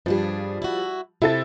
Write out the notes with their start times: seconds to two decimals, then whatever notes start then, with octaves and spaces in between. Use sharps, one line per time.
0.06 G2 F3 G3 D4 G#4
0.62 E4 F#4
1.22 C3 E4 A4 A6